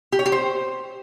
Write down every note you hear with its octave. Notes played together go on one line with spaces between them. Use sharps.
G4
C#5
G4
C5